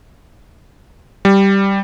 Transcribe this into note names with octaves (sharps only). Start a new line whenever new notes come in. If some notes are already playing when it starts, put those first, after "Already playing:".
G3